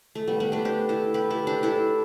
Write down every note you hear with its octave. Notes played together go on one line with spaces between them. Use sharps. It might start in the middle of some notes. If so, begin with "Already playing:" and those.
A3
G3 B3
G3 B3
A3 D4
D4 G4
E4 A4
G4 B4
E4 A4
D4 G4
E4 A4